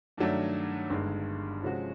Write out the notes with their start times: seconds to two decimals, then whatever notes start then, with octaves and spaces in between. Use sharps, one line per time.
0.17 G2 D#3 F#3 A3 D4
0.90 G1 G2 D#3 G#3
1.63 C3 F3 G#3 C#4 F#4